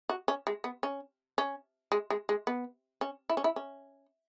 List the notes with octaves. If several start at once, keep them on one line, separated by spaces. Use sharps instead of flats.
F#4
C#4
G#3
B3
C#4
C#4
G#3
G#3
G#3
B3
C#4
E4
C#4
E4
C#4